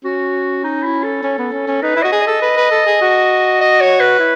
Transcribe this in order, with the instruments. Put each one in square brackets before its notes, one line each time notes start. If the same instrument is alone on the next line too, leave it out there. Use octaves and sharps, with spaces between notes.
[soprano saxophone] C#4 [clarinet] F#4
[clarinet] D#4
E4
A4
[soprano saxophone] C#4
B3
C#4
C#4
[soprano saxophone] D#4 [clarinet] B4
[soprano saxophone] E4
[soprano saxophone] F#4 [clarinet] D#5
[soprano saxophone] G#4
[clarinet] D#5
[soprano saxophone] A4
B4
B4
A4
G#4
F#4
[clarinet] D#5
C#5
B4
[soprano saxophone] E4